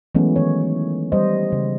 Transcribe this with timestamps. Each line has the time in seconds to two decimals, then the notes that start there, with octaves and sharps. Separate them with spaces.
0.15 E3 F#3 G#3 A3 B3 C#4
0.36 D#3 E3 C#5
1.12 G3 C5 D#5
1.52 C#3